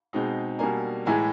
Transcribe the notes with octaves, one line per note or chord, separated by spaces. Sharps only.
B2 G#3 C4 D#4
B2 G3 A#3 D4 G#5 A#5
A2 E3 G#3 G#5 A#5